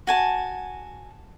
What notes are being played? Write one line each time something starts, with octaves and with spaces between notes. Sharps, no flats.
F#4 G#5 A5